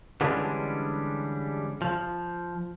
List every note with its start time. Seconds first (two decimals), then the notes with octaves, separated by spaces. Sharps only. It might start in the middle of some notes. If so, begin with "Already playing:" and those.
0.21 D3 E3 G3 G#3 C#4 D4
1.82 F3